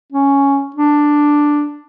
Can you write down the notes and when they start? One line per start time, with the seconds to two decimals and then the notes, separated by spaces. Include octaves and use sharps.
0.13 C#4
0.76 D4